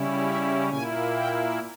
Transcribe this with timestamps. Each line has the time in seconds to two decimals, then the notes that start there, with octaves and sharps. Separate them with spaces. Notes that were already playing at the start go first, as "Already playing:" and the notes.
Already playing: C#3 G3 C#4 E4
0.25 E5
0.69 A#2 A#3 E4 G#5
1.15 G5